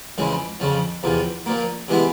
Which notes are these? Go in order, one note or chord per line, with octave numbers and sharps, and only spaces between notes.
F2 C#3 E3 G#3
F2 C#3 F3
E2 C3 F3
A#2 F3 A#3
C3 E3 G#3 B3 E4